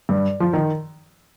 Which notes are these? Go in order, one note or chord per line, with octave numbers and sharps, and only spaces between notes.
G2
F3
D#3